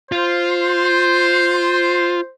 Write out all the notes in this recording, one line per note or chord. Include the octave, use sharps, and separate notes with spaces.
F4 C5